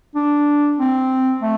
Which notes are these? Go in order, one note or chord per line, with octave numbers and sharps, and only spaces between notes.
D4
C4
A3